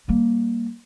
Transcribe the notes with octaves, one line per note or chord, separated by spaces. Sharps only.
G3 A#3